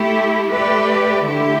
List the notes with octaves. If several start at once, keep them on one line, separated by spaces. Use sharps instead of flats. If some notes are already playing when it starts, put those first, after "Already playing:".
Already playing: A3 E4 G4
A3 G4 B4 D5
D3 A3 E4 G4